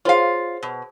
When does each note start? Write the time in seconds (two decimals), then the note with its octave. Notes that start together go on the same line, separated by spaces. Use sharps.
0.05 F4 G#4 C5 C#5 F5
0.63 B2